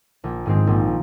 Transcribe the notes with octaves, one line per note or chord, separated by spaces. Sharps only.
A#1
G#2 D#3 G#3 C4
A#1